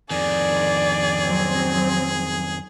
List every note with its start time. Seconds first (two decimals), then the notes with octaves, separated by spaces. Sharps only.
0.11 F2 D#3 G#4 D5
1.23 F#3 C4